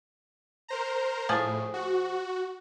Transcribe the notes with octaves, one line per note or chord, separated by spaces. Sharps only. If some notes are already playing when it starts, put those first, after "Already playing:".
A#4 C5 A#5
A2 F3 G#4
F#4